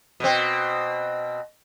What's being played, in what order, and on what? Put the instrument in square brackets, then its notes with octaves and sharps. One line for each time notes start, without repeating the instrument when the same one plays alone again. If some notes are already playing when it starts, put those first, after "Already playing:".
[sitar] B2 C4